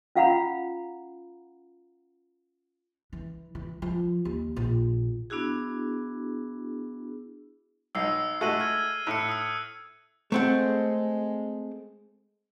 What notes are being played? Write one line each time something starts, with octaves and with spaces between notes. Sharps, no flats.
C#4 F4 F5 F#5 A#5 B5
E3
E3
F3
D#2
A#1
B3 D4 E4 F#4 G#4
B1 D#4 E6 C7
G#3 A3 F#4 E6 D#7 F#7
E6 F6 G#6
A2 F#6 C#7
D#6 C#7
G#3 A3 C4 F#5